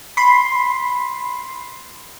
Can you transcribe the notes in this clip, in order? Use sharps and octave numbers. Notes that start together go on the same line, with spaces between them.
B5 C6